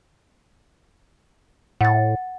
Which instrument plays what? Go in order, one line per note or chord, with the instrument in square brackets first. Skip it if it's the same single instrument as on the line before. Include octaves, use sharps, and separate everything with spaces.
[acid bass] A2 [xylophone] F#5 A6